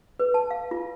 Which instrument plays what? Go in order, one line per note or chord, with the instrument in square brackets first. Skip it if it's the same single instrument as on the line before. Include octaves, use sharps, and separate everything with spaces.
[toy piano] B4
A5
F5
F4